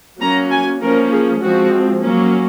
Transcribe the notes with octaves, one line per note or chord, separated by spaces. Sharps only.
F#3 A#3 C#4 A#5
G#5
F3 A#3 C#4 A#4
G#4
F3 G#3 C4 F#4
F#3 A#3 C#4